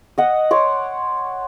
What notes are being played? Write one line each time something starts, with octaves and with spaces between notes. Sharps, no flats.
D#5 F#5
C#5 C6 D6